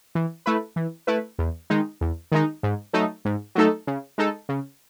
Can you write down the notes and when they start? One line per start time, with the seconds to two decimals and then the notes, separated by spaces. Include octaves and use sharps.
0.15 E3
0.46 A3 E4 B4
0.76 E3
1.07 A3 E4 B4
1.39 E2
1.70 D#3 G#3 D#4
2.01 E2
2.32 D#3 G#3 D#4
2.63 G#2
2.93 F#3 A3 D#4 A4
3.25 G#2
3.55 F#3 A3 D#4 A4
3.87 C#3
4.18 G#3 D#4 A4
4.49 C#3